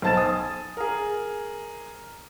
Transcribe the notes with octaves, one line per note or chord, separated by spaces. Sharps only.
B1 C5 A5 A6 E7
G#5 D#6
G#4 A#4